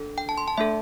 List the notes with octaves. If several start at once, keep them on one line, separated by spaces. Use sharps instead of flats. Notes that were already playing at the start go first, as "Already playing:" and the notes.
Already playing: D4 A4
G5
A5
C6
A5
A3 D4 A4 E5